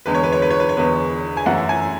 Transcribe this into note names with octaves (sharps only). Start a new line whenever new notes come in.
E2 D3 G#3 B4
C#5
B4
C#5
B4
C#5
B4
C#5
E2 D3 G#3 B4
G#5
F#2 E3 A3 F#5
F#5
G#5